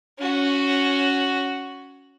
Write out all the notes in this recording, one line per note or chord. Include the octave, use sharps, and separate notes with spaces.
C#4 F#4